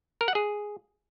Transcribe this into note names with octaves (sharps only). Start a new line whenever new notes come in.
A#4
F#5
G#4